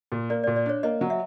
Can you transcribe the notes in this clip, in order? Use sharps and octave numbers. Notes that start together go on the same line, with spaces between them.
A#2
A#3 D5
D5
A#2
D5
D4 C#5
A#3 D#5
F#3
E5